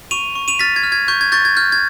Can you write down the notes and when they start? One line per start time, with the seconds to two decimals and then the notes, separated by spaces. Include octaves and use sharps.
0.11 C#6 D#7 F7
0.35 C#6
0.48 D#7 F7
0.59 F6 A6 B6
0.76 G#6
0.83 F6
0.92 G#6
1.08 C#6 G6
1.21 G#6
1.32 C#6 G6 A6
1.45 G#6
1.57 F6 G6
1.72 G#6